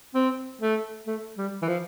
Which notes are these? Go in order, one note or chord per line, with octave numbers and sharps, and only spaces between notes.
C4
A3
A3
G3
E3
F3